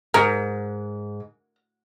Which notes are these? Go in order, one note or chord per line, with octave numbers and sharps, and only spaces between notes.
G#2 A#4